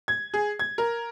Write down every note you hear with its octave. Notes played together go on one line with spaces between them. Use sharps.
G#6
G#4
G#6
A#4